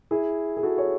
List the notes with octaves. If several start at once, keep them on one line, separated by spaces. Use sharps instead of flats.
E4 G#4
G#4
F#4 A4
C#5